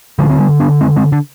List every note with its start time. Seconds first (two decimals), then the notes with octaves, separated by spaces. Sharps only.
0.19 D2 D3 F3 G#3
0.30 C4
0.40 G3 B3
0.60 B3 D4
0.81 G#3 C4
0.96 G#3 C4
1.12 D3